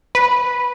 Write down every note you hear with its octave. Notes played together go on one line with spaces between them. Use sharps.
B4